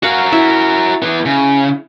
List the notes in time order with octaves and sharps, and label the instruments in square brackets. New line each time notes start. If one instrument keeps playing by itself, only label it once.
[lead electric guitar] F#4 A#4 [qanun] F5 F#5
[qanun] E4 E5
[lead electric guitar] E3 B3
C#3